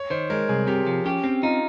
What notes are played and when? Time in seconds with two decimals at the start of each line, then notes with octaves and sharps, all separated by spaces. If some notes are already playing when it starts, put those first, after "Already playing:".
Already playing: C#5
0.10 D#3 C5
0.30 G#3 A#4
0.49 C2 G#4
0.67 C3 G4
0.86 F3
1.05 C#4 G4
1.24 C4 C#4
1.43 D#4 F4